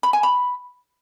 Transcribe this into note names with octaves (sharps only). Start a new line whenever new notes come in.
B5
G#5
B5